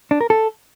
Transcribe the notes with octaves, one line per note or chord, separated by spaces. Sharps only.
D4
A#4
A4